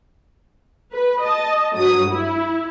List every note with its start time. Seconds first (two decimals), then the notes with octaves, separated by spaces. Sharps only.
0.92 B4
1.21 D#5 A5
1.74 G2 F#3 D#6
2.09 E4